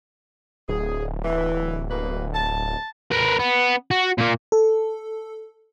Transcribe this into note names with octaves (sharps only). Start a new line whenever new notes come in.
D1 G#4
E3
B2 A#3 B4
A5
A#4 B4
B3
F#4
A#2 A#3
A4